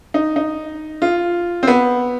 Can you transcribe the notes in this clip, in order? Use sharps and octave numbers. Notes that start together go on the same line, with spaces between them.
D#4
D#4
F4
C4
B3